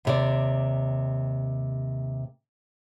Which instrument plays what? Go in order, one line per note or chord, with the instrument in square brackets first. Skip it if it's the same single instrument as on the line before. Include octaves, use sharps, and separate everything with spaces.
[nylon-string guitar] D#2 C3 D5